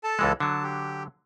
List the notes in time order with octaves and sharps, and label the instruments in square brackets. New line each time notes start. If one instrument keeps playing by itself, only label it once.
[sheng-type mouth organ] A4 A5
[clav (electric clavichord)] C#2 E3 G#3
[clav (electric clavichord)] D3 F#3 [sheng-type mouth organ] A5
[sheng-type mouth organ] G4